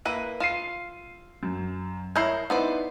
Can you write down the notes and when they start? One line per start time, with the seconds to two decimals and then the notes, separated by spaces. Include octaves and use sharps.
0.05 A#3 E4 B4 D#7
0.40 F4 C7 D#7 E7
1.43 F#2
2.16 E4 A#4 C#5 G6 C7
2.50 B3 D#4 E4 B4 C5 D5